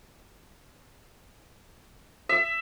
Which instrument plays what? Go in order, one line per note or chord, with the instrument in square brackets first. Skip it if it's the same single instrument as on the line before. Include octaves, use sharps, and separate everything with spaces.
[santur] E5